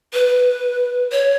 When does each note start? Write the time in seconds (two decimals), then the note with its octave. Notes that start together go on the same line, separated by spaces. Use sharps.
0.13 B4
1.12 C#5